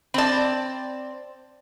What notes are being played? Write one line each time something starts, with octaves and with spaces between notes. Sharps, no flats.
C4 D5 A5 B5